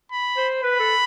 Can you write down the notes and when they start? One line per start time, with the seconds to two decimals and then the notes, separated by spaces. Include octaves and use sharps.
0.12 B5
0.37 C5
0.63 B4 B5
0.80 A4